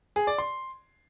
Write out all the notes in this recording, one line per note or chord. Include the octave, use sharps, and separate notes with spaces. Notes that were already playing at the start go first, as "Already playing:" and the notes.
G#4
D5
C6